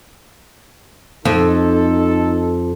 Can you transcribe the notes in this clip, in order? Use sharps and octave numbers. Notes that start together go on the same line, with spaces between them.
F2 D#4 A4